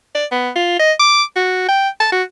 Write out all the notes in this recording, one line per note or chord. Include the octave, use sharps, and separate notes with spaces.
D5
B3
F4
D#5
D6
F#4
G5
A5
F#4